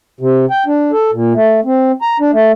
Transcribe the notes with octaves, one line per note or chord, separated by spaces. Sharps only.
C3
G5
D4
A4
A#2
A3
C4
A#5
D4
A3